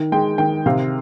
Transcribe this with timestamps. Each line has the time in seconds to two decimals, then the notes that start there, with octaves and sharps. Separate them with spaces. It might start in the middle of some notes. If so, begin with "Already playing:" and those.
Already playing: D#3
0.12 G#3 G5
0.38 D#3 G5
0.66 C3 F5